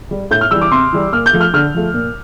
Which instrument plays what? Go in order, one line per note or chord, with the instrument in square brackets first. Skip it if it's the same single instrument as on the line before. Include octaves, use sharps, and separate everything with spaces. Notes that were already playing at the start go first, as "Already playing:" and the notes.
[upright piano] G3
A2 G6
F6
E3 G3 E6
D6
C3 C6
E3 G3
A#2 F6
G6
F3 A3
F6
D3 F6
F3 A3
A#2